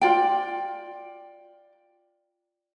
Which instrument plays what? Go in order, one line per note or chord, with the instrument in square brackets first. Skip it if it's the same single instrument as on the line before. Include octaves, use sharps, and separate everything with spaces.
[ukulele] F4 D5 G5